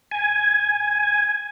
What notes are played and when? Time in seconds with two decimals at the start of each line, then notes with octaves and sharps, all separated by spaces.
0.11 G#5